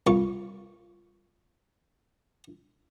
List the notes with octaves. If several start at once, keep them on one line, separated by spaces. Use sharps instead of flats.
C2 F4 C#6